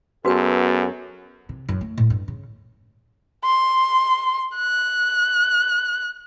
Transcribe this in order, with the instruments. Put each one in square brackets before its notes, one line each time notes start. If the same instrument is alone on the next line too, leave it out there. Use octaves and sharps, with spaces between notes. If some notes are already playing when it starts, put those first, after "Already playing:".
[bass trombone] F#2 [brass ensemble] B3 G#4 A4 [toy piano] F#4 B4 G5
[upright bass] C3
F#2
A3
A2
G2
C#3
[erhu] C6
F#6